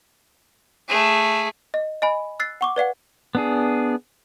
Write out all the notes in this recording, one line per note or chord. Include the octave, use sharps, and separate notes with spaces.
A3 G#4
D#5
D#5 G#5 B5
E6 F#6 A6 C7
F#5 C#6 D6
B4 D5 F5 F#5
B3 D4 G#4